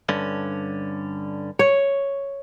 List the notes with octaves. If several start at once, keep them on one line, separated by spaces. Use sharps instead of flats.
G2 D3 C#4
C#5